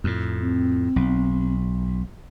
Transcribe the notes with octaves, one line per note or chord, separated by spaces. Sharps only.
F2 A2
C4
B1